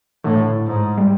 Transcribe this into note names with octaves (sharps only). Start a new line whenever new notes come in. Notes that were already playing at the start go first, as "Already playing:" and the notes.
A2 D3 E3
G#2
G3